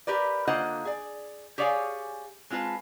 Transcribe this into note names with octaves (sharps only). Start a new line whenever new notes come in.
G4 A#4 B4 D5
D3 A#3 F4 C5 D#5 F#5
G#4 D5
G4 G#4 C#5 D5 F5 G#5
G#3 C4 F4 B4 A5